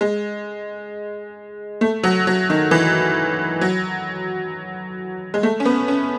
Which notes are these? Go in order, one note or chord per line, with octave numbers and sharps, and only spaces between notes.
G#3
A3
F#3
F#3
D#3
E3
F#3
G#3
A3
C#4
B3
C#4